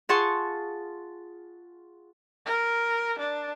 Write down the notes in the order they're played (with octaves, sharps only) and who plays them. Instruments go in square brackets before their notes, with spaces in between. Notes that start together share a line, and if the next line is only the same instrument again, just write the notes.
[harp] F4 G#4 F#5 A5 C6 C#6
[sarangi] A#4
D4